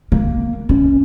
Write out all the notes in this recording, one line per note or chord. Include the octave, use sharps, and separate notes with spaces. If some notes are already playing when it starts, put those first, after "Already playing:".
A#3
C#4